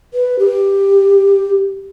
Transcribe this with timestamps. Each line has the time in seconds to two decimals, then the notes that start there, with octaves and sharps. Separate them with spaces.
0.14 B4
0.39 G4